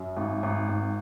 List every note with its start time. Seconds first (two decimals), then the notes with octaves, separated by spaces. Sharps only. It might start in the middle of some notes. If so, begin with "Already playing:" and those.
Already playing: F#2
0.17 G#1
0.43 G#1
0.69 G#1